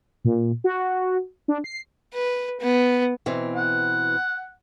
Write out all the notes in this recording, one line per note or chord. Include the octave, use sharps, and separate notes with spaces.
A#2
F#4
D4
C7
B4
B3
B2 E3 C4
F#5